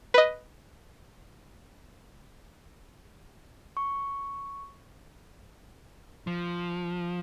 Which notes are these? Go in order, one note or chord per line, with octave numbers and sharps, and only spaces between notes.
B4 D#5
C#6
F3